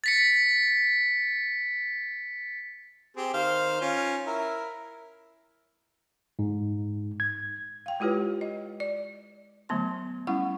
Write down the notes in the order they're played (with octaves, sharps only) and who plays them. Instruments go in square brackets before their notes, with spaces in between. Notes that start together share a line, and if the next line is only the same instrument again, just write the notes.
[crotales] A6 B6 C#7
[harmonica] C4 G4 G#4
D#3 C5 F5
C#4 F4
E4 A#4
[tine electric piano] G#2
G#6
[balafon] F5 G5
G#3 E4 F4 G4 B4 C#5
D#5
D5
D3 F#3 A3 B3 C6
G3 C#4 E4 F#5 C#6